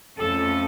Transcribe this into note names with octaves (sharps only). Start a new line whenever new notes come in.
F2 F3 A3 C#4 A4